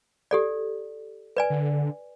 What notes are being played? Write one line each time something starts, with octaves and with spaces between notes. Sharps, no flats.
G4 A4 D5
B4 D5 G#5
D3